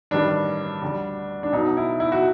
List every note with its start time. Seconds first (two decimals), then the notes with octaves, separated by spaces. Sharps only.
0.11 A1 G2 D#3 G3 D4
0.82 D2 D3 G3
1.43 D4
1.52 B1 B2 F#3 D#4
1.77 E4
2.00 E4
2.12 F#4